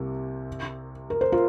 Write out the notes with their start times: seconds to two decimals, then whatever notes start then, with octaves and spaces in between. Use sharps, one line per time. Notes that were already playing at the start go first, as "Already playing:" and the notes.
Already playing: C2 C3 A#3 G4
1.10 A#4
1.21 C5
1.32 F4 A#4